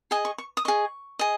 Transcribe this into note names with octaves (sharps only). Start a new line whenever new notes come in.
G#4 D#5 G#5
C#6
C#6
D#6
G#4 D#5 C#6
G#4 D#5